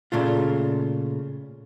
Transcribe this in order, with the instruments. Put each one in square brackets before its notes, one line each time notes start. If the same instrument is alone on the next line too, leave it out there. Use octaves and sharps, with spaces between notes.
[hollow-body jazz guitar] A#2 C#3 A3 F4